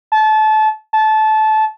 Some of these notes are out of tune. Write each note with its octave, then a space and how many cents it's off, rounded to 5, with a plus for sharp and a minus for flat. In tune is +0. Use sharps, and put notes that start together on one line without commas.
A5 -25
A5 -20